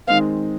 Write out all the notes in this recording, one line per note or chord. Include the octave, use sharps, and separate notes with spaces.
D#3 G#3 C4 F5